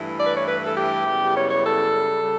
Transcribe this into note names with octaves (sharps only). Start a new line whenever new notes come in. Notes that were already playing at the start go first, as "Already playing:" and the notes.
Already playing: G2 E3 A3 E4
D5
B4
C#5
B4
A4
G4
F#2 C#3 G3 B3 E4
C#5
C#5
A4
C#3 G3